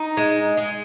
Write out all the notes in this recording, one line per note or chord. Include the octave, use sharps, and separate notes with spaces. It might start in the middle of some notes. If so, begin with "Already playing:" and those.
Already playing: D#4
G#3
G#3